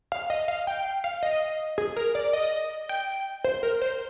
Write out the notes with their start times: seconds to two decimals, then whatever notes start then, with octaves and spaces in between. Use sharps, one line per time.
0.12 F5
0.30 D#5
0.48 F5
0.67 G5
1.04 F5
1.23 D#5
1.78 G#4
1.97 A#4
2.15 D5
2.33 D#5
2.89 G5
3.44 C5
3.63 A#4
3.82 C5